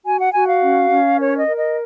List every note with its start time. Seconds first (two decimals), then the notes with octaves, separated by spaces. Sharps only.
0.06 F#4 G#5
0.20 F#5
0.34 F#4 G#5
0.48 F5
0.62 C#4
0.90 C#4
1.18 A#4 C#5
1.37 D#5
1.47 A#4
1.57 D#5